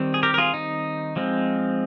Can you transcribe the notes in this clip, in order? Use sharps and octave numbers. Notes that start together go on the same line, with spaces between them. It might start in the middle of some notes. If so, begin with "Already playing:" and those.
Already playing: D#3 G3 C4
G#4
G4 A#4
A#4
F4 G#4
D#4
F3 G#3 C4